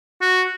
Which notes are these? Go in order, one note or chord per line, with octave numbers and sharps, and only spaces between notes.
F#4